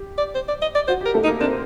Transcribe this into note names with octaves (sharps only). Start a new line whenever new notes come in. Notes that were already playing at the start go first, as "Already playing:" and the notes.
Already playing: G4
D5
C5
D5
D#5
D5
F#4 C5
G4
A#4
A3 A4
D#4
A#3 A#4
C4 D4 C5